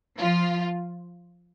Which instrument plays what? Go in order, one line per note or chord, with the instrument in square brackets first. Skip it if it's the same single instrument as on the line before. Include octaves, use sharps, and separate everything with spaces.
[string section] F3 F4